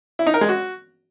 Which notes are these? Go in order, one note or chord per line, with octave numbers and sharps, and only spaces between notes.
E4
D#4
A#4
G#3
F#4